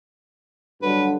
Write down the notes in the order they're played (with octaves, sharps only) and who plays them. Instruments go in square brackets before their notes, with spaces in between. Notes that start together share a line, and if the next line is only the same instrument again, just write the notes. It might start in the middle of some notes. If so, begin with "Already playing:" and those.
[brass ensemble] G2 D3 F#3 [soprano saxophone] B4